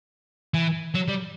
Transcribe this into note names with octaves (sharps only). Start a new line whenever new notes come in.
E3
F#3
G3